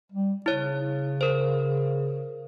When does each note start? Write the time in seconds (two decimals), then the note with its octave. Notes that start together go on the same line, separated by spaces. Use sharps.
0.12 G3
0.46 C#3 E4 C#5
1.21 A#4 C5